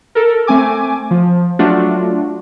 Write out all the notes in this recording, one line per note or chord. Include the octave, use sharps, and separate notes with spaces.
A4 A#4
A3 C4 G#5 D6
F3
F#3 A3 D4 F4 F#4